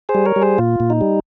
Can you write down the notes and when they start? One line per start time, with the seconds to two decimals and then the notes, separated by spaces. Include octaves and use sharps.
0.09 G#4 C5
0.15 G3
0.26 A#4 C#5
0.36 G3
0.42 G#4 C5
0.58 A#2 F4
0.80 A#2
0.90 D#4
1.01 G3